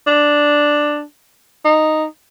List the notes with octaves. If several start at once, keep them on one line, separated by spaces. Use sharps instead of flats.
D4
D#4